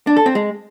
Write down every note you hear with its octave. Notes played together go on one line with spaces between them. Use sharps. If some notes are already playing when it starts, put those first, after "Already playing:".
D4
A4
C4
G#3